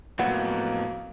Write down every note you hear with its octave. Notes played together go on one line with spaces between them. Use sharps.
F2 A2 F#3 A#3 B3 F5 F#5 B5